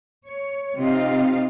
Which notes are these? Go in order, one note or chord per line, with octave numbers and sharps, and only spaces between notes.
C#5
C3 C4 D#4 F4 F5